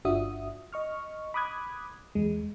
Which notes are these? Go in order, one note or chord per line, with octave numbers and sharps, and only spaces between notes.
G1 D4 F4 F#4 E5 D#6
D#5 C#6 F6
B5 D6 D#6 F#6 G#6
E2 G#3